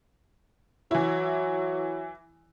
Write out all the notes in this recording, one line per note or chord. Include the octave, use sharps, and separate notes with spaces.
E3 F#3 E4